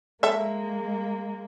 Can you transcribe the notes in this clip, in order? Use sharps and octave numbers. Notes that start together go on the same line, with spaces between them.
G#3 A#3 A4 E5